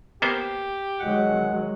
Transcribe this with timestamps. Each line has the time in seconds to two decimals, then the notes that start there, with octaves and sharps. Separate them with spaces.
0.22 A#3 B3 G4 C5
1.00 D#3 F#3 G#3 F#5